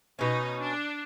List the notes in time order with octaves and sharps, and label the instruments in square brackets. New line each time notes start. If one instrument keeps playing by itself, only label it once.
[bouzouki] B2 C#4 [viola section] D#4
[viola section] D4